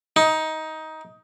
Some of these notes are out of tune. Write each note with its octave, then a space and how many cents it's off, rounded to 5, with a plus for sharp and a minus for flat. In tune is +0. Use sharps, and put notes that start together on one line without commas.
D#4 +15